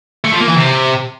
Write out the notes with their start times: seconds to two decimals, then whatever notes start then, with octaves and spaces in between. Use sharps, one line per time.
0.24 A3
0.32 F3
0.40 A#3
0.48 E3
0.56 C3